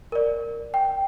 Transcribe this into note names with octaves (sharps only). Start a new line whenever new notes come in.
A#4 D5
G5